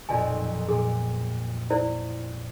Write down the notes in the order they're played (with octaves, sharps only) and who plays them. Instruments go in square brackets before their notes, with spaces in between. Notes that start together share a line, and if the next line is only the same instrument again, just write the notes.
[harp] B1 F2 A#2 [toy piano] D5 G#5
[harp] A#2 D6 [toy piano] G#4
[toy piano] E4 C5 D5